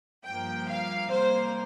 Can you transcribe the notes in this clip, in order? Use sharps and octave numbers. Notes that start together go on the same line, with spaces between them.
G2 F3 A#3 G5
F5
C3 G3 A#3 C5